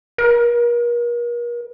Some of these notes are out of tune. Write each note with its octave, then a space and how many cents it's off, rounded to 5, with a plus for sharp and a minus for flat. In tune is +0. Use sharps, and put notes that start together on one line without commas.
A#4 +40